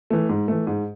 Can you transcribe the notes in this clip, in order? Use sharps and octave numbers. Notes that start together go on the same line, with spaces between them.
E3 A3
G#2
E3 A3
G#2